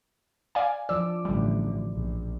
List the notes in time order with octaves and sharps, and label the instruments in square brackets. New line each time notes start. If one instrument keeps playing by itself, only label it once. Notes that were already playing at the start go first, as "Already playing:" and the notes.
[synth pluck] D5 F5 G#5
[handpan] F3 D5 [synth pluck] E6
[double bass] A1 D3 [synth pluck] G3
[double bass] A#1